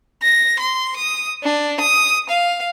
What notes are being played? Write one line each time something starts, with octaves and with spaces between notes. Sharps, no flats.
A#6
C6
D#6
D4
D#6
F5